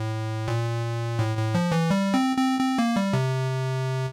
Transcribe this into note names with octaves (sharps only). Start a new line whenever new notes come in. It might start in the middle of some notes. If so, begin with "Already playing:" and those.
Already playing: A2
A#2
A2
A2
F3
E3
G3
C4
C4
C4
A#3
G3
C3